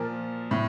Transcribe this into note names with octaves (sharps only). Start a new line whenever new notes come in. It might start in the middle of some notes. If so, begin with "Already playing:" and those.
Already playing: A#2 F3 A#4
A2